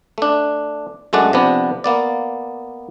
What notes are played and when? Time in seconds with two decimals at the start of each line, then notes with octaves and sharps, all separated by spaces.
0.18 A3 D4
1.13 F#2 G#3 A3 D4 D5 F#5
1.33 C3 F3 B3 D4
1.84 A#3 B3 D5